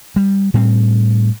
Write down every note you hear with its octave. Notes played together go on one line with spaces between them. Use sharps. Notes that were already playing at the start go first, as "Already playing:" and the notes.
G3
A2 G3 C4